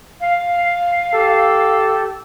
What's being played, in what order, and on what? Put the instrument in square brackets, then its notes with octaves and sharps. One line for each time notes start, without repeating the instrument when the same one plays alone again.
[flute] F5
[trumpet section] G4 A4